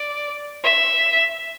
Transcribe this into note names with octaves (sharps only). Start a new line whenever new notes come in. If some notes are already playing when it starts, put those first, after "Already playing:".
Already playing: D5
E5